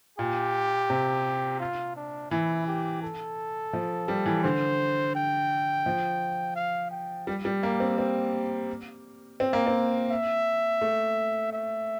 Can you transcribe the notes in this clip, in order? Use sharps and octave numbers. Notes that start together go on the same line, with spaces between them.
A#2 G4
C3
F4
D4
E3 E4
G4
A4
F3
G3
E3
D3 C5
G5
F3
F5
G5
G3
G3
A#3
C4
C4
C4
A#3
C4
E5
A3
E5